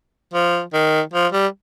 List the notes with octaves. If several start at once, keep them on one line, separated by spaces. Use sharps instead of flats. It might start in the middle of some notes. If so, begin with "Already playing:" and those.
F3
D#3
F3
G3